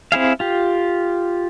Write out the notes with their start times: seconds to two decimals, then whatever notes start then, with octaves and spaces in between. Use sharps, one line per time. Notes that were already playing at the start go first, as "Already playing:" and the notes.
0.12 C4 E4 G#4 F5
0.40 F4 G4